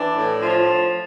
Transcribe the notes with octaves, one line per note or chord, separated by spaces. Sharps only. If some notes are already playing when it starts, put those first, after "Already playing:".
Already playing: E3 D4
A2
F3